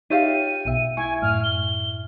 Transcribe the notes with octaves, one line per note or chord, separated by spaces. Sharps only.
D#4 F4 G4 C#5 E5 F5 D#7
B1 B2 E5
E4 G#5 C#6
F#2 A2 F6
G7